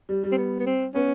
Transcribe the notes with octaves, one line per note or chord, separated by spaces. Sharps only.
G3
G3
C4
B3
B3
C4
B3 C#4